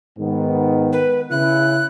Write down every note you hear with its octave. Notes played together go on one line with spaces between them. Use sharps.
G#2 D#3 B3
B4
C#3 E4 F#6